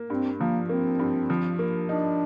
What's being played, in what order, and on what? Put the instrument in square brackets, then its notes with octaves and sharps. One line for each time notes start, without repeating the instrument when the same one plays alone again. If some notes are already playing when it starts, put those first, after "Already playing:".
Already playing: [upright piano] A#3
[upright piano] G2 [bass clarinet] C4
[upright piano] F3 [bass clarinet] A#3
[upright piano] A#3 [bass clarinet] C4
[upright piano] G2
F3
A#3
[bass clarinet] D4 [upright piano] D#4